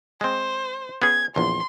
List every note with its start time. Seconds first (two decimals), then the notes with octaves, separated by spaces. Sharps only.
0.21 G#3 C4 C5
1.02 B3 C#4 G#4 G#6
1.36 A#1 E2 C6